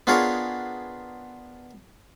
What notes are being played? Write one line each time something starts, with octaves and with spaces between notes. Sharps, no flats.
B3 D4 F4 G#4 A#4 C#5